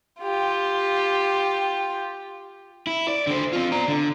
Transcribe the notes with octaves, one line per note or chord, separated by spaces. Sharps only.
F4 G4
E4
D5
D3 C5
C4 F4
D5 A#5
D3